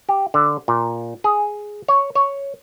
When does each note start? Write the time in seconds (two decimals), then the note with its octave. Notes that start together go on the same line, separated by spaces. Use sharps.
0.09 G4
0.34 D3
0.68 A#2
1.24 G#4
1.88 C#5
2.15 C#5